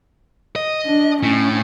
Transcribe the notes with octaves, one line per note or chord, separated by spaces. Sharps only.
D#5
D4
A2 C#4